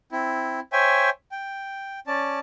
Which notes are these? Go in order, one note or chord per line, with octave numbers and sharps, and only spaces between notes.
C4 E4
C5 C#5 E5 G5 G#5
G5
C#4 D5 A5